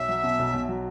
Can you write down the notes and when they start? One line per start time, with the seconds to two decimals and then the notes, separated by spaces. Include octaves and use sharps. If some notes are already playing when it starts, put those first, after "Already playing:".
Already playing: B1 E5
0.09 F#3
0.23 B2
0.39 B1
0.53 B1
0.69 F#3